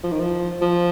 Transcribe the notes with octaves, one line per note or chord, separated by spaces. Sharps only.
F3
D#3
F3
F3